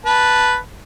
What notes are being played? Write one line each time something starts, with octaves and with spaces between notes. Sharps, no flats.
B4 A5